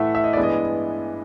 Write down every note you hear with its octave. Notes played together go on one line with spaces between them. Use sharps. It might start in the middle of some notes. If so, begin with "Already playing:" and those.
Already playing: A2 E3 A3 E5 F#5
E5
D#5
G2 E3 G#3 B3 D5
D#5